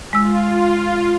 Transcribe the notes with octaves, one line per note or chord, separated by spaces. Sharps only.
G#3 F4 E6